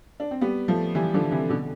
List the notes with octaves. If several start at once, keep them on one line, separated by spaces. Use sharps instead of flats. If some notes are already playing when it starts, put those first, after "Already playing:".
D4
C4
G3 B3
F3 A3
E3 G3
D3 F3
C3 E3
B2 D3